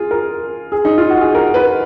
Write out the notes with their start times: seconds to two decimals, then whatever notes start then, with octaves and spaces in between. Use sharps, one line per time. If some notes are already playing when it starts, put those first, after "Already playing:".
Already playing: F4 G#4
0.11 A#4
0.72 G#4
0.85 D#4
0.98 F4
1.10 F#4
1.21 G#4
1.35 A#4
1.54 B4